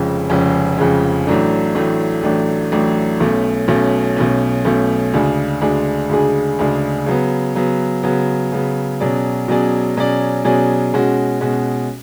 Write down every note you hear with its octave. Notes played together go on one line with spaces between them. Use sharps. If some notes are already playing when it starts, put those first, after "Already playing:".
Already playing: F1 F2 C#3 G#3 C#4
F1 F2 C#3 G#3 C#4
F1 F2 C#3 G#3 C#4
A1 A2 F#3 A3 D4
A1 A2 F#3 A3 D4
A1 A2 F#3 A3 D4
A1 A2 F#3 A3 D4
B1 B2 A3 C#4
B1 B2 A3 C#4
B1 B2 A3 C#4
B1 B2 A3 C#4
D2 C#3 G#3 D4 G#4
D2 C#3 G#3 D4 G#4
D2 C#3 G#3 D4 G#4
D2 C#3 G#3 D4 G#4
C#3 F#3 B3
C#3 F#3 B3
C#3 F#3 B3
C#3 F#3 B3
B2 F#3 C#4 G#4 D5
B2 F#3 C#4 G#4 D5
B2 F#3 C#4 G#4 D5
B2 F#3 C#4 G#4 D5
B2 G#3 C#4 F#4
B2 G#3 C#4 F#4